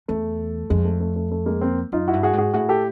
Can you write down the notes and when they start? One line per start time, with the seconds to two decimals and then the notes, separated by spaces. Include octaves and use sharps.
0.08 E2 A3
0.70 F2 G#3
0.85 A3
1.00 A3
1.16 A3
1.31 A3
1.46 G#3 A#3
1.61 A#3 C4
1.92 F#2 D#4 F4
2.08 E4 F#4
2.13 G2
2.23 F#4 G#4
2.33 G#2
2.38 F#4 G#4
2.54 A2 F#4 G#4
2.69 G4 A4